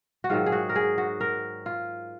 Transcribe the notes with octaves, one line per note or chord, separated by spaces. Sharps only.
F#4
G#2 D#3 F#3 F4
G#4
F#4
A#4
G#4
F#4
A#4
F4